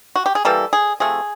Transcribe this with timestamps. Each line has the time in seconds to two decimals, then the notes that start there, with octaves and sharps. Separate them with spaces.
0.16 F#4
0.26 G4
0.35 G#4
0.45 E3 G3 A#3 A4
0.73 G#4
1.00 C3 F3 A3 G#4